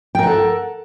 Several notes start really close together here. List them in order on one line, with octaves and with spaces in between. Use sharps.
G5 A#4 F#5 A4